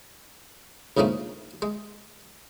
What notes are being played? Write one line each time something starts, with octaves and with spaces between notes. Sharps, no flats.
D2 G#2 C#3 F3 A3 A#3
G#3